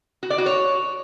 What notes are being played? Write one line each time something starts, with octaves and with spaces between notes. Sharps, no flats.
F#4
D5
F#4
C#5